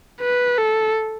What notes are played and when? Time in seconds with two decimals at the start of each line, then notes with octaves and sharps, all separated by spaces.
0.21 B4
0.58 A4